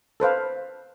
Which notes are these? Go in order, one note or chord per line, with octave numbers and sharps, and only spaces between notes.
A4 B4 C5 F5